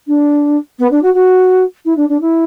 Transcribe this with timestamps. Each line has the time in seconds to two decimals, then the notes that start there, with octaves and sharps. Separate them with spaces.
0.07 D4
0.79 B3
0.91 D4
1.02 F#4
1.14 F#4
1.85 E4
1.96 D4
2.09 D4
2.21 E4